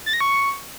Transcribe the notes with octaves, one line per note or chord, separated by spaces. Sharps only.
A6
A#6
C#6